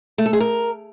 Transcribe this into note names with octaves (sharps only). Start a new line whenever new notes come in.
A3
A4
G#4
A#4